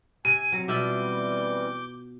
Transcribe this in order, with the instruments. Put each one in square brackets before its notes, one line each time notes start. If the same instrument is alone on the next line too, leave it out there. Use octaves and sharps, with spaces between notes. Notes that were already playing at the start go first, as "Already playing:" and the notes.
[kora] C3 [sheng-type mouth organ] G#5 [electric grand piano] D#7
[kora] F#3 [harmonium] C4 A#5
[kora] B2 F4 E5 [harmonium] E3 G3 C4 [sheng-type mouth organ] D6 G6